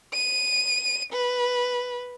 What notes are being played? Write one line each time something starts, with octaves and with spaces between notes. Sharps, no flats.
D#7
B4